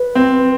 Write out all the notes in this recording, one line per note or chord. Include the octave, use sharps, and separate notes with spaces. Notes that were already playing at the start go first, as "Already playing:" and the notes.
Already playing: B4
C4